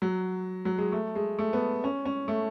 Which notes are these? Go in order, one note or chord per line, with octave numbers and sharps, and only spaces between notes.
F#3
F#3
G#3
A3
G#3
A3
B3
C#4
C#4
A3